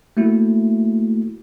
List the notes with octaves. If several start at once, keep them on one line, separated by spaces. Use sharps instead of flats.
A3 A#3 E4 F#4